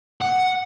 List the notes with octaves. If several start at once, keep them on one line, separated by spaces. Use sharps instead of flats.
F#5